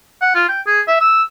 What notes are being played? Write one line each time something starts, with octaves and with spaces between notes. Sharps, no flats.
F#5
F4
G5
G#4
E5
E6